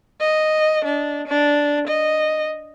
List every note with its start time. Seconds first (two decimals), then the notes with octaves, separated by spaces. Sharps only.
0.21 D#5
0.85 D4
1.27 D4
1.88 D#5